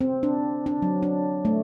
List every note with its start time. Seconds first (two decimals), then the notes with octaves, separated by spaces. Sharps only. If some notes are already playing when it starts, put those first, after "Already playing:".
0.01 C4
0.23 D4
0.66 D4
0.82 F#3
1.03 D4
1.45 A3